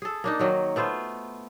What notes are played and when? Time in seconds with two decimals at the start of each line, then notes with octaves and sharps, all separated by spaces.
0.02 G#4 A4
0.24 A#3 D4 D#4
0.39 D#3 F#3 A#3
0.76 A3 B3 F4 C5